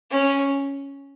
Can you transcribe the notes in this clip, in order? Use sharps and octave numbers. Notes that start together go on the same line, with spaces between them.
C#4